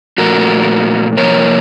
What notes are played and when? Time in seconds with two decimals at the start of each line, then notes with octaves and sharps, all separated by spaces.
0.18 A#2 F3 A3 F#4 A#4
1.17 C3 F3 A#3 A#4 C#5